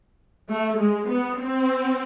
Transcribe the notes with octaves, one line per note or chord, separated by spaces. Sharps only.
A3
G#3
B3
C4